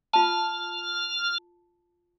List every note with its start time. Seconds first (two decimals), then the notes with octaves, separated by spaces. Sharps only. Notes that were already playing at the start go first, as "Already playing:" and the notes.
0.13 F4 A5 F6